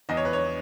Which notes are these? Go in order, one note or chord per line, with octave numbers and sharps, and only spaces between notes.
E2 D#5
C#5
B4
C#5